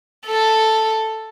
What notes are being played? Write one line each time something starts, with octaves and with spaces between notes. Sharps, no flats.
A4